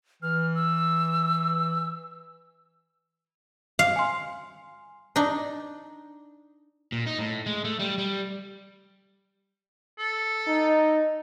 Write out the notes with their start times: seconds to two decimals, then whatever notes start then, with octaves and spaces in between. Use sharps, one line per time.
0.22 E3 F6
0.55 E6
3.79 F5
3.96 G#5 C6
5.16 D4 D#4
6.92 A#2
7.07 D#4
7.19 A2
7.46 G#3
7.65 A3
7.79 G3
7.98 G3
9.99 A4
10.47 D#4